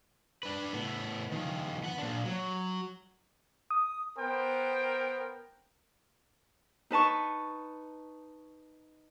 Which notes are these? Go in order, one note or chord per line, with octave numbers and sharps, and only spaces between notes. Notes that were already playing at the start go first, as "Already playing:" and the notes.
D4 B4
A2 B3
D#3 F3
B3 F#5
A#2 D4
F#3
D#6
B3 A#4 C5 G5
D#4 B4 A5 C#6